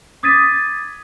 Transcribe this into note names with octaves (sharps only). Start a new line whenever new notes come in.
D6 D#6 G#6 A6 B6 D#7